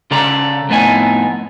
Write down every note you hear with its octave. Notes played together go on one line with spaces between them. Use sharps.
C#3 A4 D5 A#5
F2 A2 B3 D#4 G#5